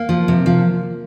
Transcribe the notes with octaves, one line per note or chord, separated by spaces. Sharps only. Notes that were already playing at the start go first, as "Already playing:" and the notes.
Already playing: A#3
F3
C3
F3